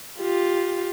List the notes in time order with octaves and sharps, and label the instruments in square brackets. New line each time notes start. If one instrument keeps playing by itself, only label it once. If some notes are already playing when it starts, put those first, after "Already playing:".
[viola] F4 G4